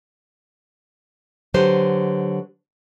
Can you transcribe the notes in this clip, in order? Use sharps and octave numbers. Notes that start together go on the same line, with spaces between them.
D3 F#3 G4 B4 C5